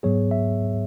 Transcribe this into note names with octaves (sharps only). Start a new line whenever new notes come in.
G#2 F#3 B3 G#4 C#5
E5